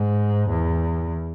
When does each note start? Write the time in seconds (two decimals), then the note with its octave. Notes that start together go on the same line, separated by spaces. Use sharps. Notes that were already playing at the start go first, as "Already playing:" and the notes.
Already playing: G#2
0.50 E2